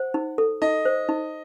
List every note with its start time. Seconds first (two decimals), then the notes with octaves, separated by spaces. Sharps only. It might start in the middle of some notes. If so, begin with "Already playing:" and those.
Already playing: C5 F#5
0.14 D#4
0.38 A4
0.62 D#4 D#5
0.85 C5
1.09 D#4